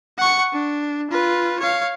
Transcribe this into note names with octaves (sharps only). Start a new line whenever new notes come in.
F#5 C#6
D4
F4 B4
C#5 F5